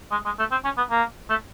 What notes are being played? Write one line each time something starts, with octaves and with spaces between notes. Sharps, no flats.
G#3
G#3
A3
C4
C#4
B3
A#3
A3